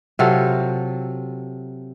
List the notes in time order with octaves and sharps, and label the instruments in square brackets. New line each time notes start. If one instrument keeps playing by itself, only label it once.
[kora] C3 F#3 F4 A4